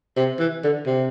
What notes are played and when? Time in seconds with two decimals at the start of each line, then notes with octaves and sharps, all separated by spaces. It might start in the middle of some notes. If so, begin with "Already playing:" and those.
0.17 C3
0.40 E3
0.64 D3
0.86 C3